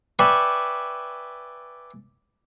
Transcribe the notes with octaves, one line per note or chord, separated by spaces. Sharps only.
B4 D5 E5 G5 G#5 C#6